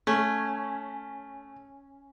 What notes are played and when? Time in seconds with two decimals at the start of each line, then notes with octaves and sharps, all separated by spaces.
0.07 A3 C#4